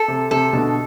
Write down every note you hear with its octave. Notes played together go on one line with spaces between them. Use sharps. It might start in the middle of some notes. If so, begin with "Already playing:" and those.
Already playing: A4
C3
C3 A4
B2 D3